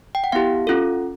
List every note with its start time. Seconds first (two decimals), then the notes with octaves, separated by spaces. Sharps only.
0.15 G5
0.24 F#5
0.32 B3 E4 G4 F5
0.67 C#4 F4 A4